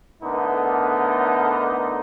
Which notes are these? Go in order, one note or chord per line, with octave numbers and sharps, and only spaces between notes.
A2 D3 B3 D#4 A#4